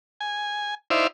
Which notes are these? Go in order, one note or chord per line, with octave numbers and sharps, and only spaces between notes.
G#5
D#4 E4 C5 D5 E5 F5